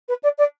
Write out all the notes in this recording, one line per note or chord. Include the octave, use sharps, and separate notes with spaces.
B4
D5
D5